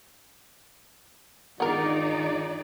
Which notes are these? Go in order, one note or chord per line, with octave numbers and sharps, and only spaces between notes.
D#3 B3 D4 D#4 F4 G#4 A#4 D5